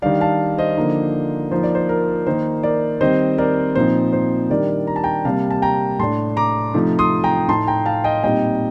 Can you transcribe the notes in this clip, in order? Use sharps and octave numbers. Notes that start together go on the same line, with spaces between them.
D#3 G3 D4 D5 F5
F5 A5
C5 D#5
D3 F3 A#3 D#4
F3 A#3 D#4 C5
D5
C5
A#4
D#3 A#3 D#4 C5
A#4 D5
D#3 G3 C4 C5 D#5
A#4 D5
A#2 F3 C4 D#4 C5
C5
D#3 G3 D4 A#4 D5
A#5
A5
G5 A#5
C3 G3 A#3 F5 A5
A5
G5 A#5
A2 A3 D4 A5 C6
A#5 D6
C3 F3 A3 D#4
C6 D#6
G5 A#5
A2 A3 D#4 A5 C6
G5 A#5
F5 A5
D#5 G5
A#2 G3 C4 D#4 D#5 G5